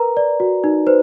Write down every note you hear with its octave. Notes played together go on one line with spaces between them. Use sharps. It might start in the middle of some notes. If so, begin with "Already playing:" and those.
Already playing: A#4 B4 A#5
D5
F#4
D#4
B4 C5